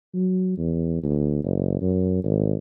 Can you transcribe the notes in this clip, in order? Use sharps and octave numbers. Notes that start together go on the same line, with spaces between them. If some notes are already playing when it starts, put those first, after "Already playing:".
F#3
E2
D2
F#1
F#2
G#1